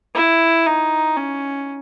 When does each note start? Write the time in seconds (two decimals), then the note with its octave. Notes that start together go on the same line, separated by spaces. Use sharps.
0.15 E4
0.66 D#4
1.17 C#4